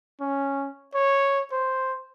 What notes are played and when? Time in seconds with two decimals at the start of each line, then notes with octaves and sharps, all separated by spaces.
0.21 C#4
0.94 C#5
1.52 C5